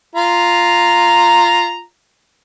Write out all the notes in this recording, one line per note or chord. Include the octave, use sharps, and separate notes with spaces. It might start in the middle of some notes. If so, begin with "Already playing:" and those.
F4 A#5